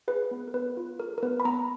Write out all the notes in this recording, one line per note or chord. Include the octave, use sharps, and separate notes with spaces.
G#4 B4
B3
A#4
B3 B4
F4
G#4 A#4
A#4
B3 B4
B5
B3 A#5